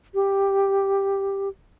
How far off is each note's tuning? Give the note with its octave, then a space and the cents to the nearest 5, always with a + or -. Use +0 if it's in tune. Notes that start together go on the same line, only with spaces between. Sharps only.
G4 +5